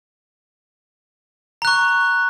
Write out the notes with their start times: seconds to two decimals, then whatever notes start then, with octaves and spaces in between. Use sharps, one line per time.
1.62 A#5
1.65 F#6
1.67 C#6